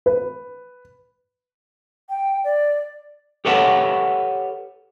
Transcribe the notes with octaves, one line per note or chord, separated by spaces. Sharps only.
B4
G5
D5
G4 A4 B4 C#5 E5 F#5